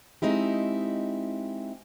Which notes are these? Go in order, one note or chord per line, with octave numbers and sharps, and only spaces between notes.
G#3 C4 D#4 E4 G4